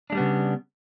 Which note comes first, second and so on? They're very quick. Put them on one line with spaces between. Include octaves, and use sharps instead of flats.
D4 G#3 G3 B3 C#3